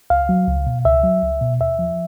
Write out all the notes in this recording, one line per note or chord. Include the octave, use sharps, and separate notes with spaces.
C#2 F5
F#3
C#2
B2
C#2 E5
F#3
C#2
B2
D#2 E5
F3